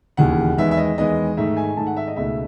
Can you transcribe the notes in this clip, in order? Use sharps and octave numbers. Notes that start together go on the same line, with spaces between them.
E1 D#2 C#3 E3 F#5
E2 D#3 G#3 B3 E5
E5
D#5
E2 D#3 G#3 B3 D#5
G#2 D#3 A3 E5
G#5
G#2 D#3 A3 A5
F#5
E5
D#5
C#2 B2 A3 D#4 E5